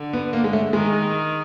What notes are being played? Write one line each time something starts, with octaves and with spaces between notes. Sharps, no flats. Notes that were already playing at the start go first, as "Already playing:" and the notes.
Already playing: D3
B3
A#3
G#3
A3
D#3 G#3